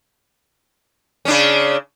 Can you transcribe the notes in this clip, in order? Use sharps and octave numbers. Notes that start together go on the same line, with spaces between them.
C#3 C#4 D4